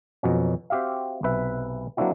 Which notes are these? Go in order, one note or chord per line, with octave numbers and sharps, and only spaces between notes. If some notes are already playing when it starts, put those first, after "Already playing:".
F2 B2 F#3 C#4
C4 F#4 G4 E5 F5
B1 C3 B4 E5
F#3 A#3 C4 D4 E4 F#4